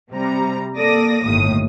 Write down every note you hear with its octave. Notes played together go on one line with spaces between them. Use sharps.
C3 G3 A#5
A#3 A4 D5 D#6 A#6
G1 D#2 A2 D#6